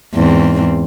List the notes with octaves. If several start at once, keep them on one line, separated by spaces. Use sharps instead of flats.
E2 G#2 C4